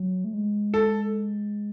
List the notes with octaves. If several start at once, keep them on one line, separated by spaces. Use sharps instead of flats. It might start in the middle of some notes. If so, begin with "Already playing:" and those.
Already playing: F#3
A3
G#3
A4